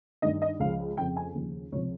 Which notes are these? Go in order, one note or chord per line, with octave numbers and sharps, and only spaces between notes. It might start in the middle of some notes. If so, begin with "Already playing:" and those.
G2 D#3 D#5
D#5
C#2 C#3 F3 F5
F2 C#3 F3 G5
G#5
D#2 C#3 F3
C#2 C3 F3 C#5